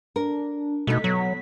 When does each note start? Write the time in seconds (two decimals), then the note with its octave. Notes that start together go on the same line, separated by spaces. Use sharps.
0.16 D4 A#4
0.87 B2 A3 D#4 B6
1.04 B2 F#3